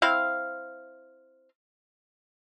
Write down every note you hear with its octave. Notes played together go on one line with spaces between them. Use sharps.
C4 E4 F5